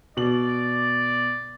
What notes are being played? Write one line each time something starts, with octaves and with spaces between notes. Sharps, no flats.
B2 D5 F#7